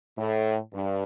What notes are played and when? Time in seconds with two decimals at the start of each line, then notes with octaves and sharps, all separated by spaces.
0.17 A2
0.73 G2